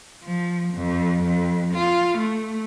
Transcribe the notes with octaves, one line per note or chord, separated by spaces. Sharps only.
F3
F2
F2
F4
A3